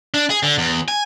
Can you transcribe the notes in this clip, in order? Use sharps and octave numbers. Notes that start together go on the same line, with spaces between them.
D4
G#4
D3
E2
G#5